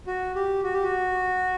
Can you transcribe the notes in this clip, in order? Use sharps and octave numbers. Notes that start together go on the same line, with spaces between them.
F#4
G4
F#4
G4
F#4